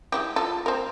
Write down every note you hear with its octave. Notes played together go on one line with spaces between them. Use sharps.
G#3 E4 G4
F4 A4
C4 A#4